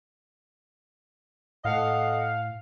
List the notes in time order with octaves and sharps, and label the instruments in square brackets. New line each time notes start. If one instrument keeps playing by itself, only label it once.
[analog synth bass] A2 [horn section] A4 D#5 F#5 [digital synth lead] F5